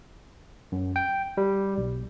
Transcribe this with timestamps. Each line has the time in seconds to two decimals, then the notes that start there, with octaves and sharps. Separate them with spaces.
0.72 F#2
0.96 G5
1.37 G3
1.78 B1